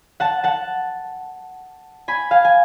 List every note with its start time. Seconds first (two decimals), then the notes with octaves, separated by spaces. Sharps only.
0.20 F#5 A5
0.44 F#5 A5
2.08 G#5 B5
2.31 F5 G#5
2.45 G#5